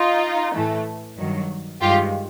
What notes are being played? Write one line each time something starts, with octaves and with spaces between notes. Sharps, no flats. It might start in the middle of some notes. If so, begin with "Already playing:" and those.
Already playing: D#4 F4
A2 E3 A3
G2 D#3 F#3
G2 D#3 G#3 F4 G4